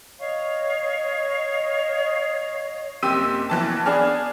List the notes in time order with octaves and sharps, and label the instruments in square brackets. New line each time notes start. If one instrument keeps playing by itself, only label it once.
[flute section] C#5 D#5 F5 C#6
[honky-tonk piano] F#1 C3 G4 C6 E6 D#7
B1 E3 A5
B3 D4 G#4 F6